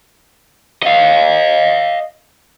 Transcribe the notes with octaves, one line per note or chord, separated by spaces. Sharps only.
D#5 F5